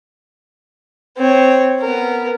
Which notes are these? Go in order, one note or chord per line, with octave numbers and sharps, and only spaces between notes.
C4 C#5
B3 A#4